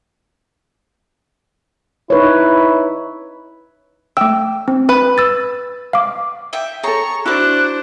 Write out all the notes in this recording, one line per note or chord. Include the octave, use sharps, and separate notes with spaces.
D#4 E4 B4 C#5
A3 G5 E6
C4
B4
E6 A6
F5 D6
E5 G5
G#4 A4 C#5 A#5 C#6
D4 E4 F#4 C5 A5 D6 F#6